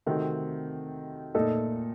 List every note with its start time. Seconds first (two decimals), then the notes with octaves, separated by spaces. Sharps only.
0.06 C3 D#3 A3 C4 F#4
1.35 A#2 A3 D#4 A4